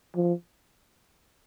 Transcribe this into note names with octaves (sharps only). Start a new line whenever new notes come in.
F3